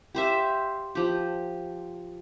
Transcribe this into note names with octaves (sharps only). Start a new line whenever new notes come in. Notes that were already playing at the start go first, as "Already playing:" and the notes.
G4 C5 E5 F5
F3 G4